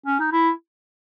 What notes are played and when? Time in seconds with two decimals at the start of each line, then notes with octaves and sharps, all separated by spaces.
0.06 C#4
0.19 D#4
0.32 E4